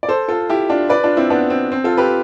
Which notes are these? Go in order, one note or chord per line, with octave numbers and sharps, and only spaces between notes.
D5
A4 C5
F4 A4
E4 G4
D4 F4
B4 D5
D4 F4
C4 E4
B3 D4
C4
C4
F4 A4
G4 B4